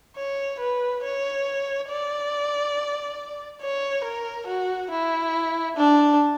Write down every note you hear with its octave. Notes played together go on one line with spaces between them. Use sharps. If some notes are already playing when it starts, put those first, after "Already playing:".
C#5
B4
C#5
D5
C#5
A#4
F#4
E4
D4